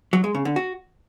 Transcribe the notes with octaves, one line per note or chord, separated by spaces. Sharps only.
F#3
G#3
C#3
D3
F#4